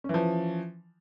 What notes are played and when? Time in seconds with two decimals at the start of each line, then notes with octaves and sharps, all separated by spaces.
0.04 C#4
0.09 E3
0.14 F3